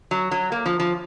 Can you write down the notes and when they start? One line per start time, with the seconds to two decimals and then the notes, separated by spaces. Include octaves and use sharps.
0.11 F#3
0.31 F#3
0.52 A#3
0.66 F3
0.80 F3